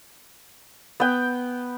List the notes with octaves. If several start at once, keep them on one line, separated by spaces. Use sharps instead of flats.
B3 G5